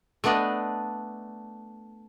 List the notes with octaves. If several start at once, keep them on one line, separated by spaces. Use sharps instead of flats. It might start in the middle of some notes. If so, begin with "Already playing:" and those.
A3 B3 D4 D5 D#5